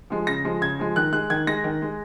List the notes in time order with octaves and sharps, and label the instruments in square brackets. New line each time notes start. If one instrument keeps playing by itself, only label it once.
[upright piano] F3 G#3
C#3 A#6
F3 G#3
C#3 G#6
F3 G#3
D#3 F#6
G#3 F#6
D#3 G#6
G#3 A#6
D#3
G#3